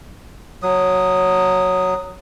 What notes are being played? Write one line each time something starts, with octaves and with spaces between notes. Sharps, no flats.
F#3 D#6